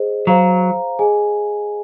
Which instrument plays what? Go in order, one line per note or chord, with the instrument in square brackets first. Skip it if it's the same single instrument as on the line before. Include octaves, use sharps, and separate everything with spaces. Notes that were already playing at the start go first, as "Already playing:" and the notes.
Already playing: [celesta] G#4 C5 D#5
[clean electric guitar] F#3 [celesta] C5 F5 A#5
[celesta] G#4 D#5 G#5